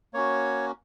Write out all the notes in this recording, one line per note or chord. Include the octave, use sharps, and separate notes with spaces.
A#3 C#4 F#4 C#5